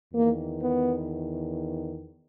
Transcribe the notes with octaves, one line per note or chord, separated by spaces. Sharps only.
E2 D#3 A#3
B3